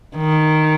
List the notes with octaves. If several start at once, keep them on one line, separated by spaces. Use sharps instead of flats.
D#3